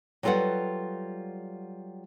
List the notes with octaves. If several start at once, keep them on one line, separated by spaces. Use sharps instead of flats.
F#3 G3 F4 A4 B4 F#5